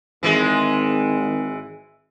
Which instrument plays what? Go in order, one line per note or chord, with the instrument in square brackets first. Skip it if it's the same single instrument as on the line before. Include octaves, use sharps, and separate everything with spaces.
[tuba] G#1 [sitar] E3 G#3